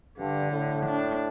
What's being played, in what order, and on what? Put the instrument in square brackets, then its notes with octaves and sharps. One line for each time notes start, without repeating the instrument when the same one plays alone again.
[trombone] G2 [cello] D3
[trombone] A2
[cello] D4